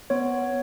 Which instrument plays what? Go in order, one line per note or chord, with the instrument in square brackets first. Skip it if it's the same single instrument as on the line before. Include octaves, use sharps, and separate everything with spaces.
[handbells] B3 C#5